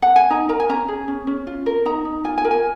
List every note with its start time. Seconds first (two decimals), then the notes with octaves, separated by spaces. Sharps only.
0.02 F#5
0.16 G#5
0.30 D#4 A#5
0.49 A#4 A#5
0.60 G#5
0.69 C#4 A#5
0.88 G#4
1.08 C#4
1.27 C#4
1.47 F4
1.66 A#4
1.85 D#4 A#5
2.05 D#4
2.24 F4 G#5
2.38 G#5
2.45 A#4
2.51 G#5